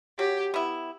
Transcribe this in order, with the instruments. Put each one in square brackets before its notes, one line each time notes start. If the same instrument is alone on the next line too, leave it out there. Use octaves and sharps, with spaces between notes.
[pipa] F#3 [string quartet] G4
[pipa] B3 E4